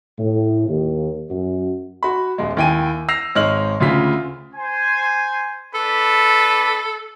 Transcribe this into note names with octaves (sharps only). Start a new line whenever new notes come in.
A2
D#2
F#2
F#4 B5
D#1 G#3
D#2 E4 G5 G#5 D#7
E6 A#6 C7 F7
G#1 G#3 D#4 C#5 F6 F#7
D2 C#3 F4 B6
C5 G#5
D4 A4 B4 B5